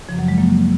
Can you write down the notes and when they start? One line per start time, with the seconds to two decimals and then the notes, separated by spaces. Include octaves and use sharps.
0.09 F#2 C#3 F3
0.19 F#3
0.28 F3 G#3
0.38 F#3 A#3